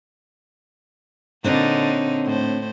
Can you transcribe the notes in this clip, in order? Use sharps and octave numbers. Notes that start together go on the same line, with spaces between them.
A#2 D3 C4 D4 D#4 C#5
A2 C5